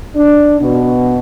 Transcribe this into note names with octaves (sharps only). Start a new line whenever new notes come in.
D4
B2